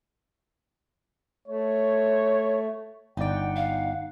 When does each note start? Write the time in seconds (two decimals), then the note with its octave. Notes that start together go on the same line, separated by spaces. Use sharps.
1.48 A3 C#5
3.17 G1 D#4 D5 F#5 G5
3.56 F5